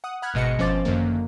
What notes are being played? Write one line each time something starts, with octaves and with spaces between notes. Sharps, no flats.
F#5 D#6
F#5 B5 F6 F#6 G#6
G#1 G#2 B2 D#5 A#6 C#7
G1 F3 C#4 C5 D6 A6
F#2 D3 D#3 A#3